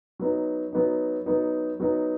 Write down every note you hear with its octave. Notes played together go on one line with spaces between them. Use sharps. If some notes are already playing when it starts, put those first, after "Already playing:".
F#3 B3 D#4
F#3 B3 D#4
F#3 B3 D#4
F#3 B3 D#4